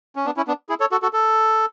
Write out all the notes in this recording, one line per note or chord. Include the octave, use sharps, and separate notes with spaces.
C#4
B3 D4
C#4 E4
B3 D4
E4 G#4
A4 C#5
F#4 A4
F#4 A4
A4